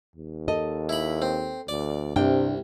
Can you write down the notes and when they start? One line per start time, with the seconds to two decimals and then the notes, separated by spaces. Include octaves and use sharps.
0.16 D#2
0.48 A4 D#5
0.89 E4 B5
1.22 C4
1.69 D2 D5
2.16 C2 G2 C3 D4 G5